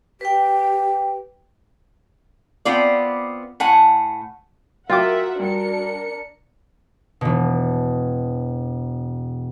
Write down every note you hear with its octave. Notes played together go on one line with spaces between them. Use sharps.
G4 B4 G5
B3 C4 F4 D5
A2 F#5 G#5
F#3 F4 F#4 A#4 E5 F#5 G5 D6
G2 D4 A#4 C#7
E1 B2